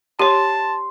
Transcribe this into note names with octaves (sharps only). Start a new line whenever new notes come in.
G4 C#5 A5 C6